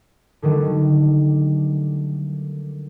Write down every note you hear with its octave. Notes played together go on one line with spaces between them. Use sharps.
D3 D#3 F#3 G3 A3